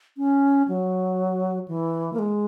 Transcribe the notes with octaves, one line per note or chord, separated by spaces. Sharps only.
C#4
F#3
E3
A#3
G#3